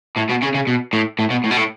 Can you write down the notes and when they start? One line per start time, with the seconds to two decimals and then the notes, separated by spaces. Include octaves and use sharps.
0.16 A2
0.29 B2
0.42 C#3
0.54 C#3
0.67 B2
0.93 A2
1.19 A2
1.31 B2
1.44 A2
1.51 B2
1.57 A2